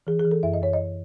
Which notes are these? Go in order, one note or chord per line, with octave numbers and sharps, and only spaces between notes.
E3 G#4
G#4
E3
A4
F#2 E5
D#5
F#2 C#5
D#5